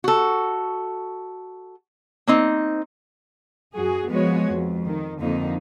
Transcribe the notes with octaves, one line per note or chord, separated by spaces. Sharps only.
F#4 A4
A#3 C4 D#4
F#2 F#4 G#4
F3 G#3 B3 F#4 C#5
F2
D#3
F2 D3 A#3 D#4